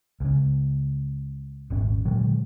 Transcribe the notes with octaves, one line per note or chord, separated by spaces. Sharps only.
C#2 C#3
D#1 G#1 C#4
A#2 D3 F#3 G#3